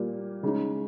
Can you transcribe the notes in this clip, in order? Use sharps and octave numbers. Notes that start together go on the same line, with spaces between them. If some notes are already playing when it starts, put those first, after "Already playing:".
Already playing: A#2 G3 A#3
C#3 G#3 D#4